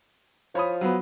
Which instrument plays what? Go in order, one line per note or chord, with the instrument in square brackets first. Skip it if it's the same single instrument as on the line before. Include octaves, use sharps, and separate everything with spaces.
[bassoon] F3 [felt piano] C#5 B5 D#6
[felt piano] F#3 B3